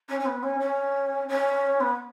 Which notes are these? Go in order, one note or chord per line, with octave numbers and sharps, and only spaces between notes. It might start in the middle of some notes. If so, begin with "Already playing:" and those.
C#4
C#4
B3
C#4
C#4
C#4
B3